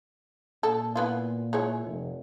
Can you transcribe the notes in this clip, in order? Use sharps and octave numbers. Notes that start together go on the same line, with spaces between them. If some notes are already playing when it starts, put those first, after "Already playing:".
A#2 A4
E3 B3 F4
G#3 E4 C#5
F1